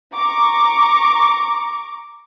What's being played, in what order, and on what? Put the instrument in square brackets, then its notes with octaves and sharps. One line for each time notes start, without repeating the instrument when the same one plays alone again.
[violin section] A#5 C#6 D6